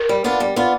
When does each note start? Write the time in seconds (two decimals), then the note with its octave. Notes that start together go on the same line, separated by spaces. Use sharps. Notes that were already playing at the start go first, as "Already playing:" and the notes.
Already playing: A#4
0.09 G3
0.24 B3 D4 F4
0.40 G3
0.56 B3 D4 F4